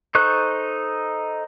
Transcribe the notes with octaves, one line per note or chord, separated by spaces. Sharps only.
D#4 A4 C5 C#6 F#6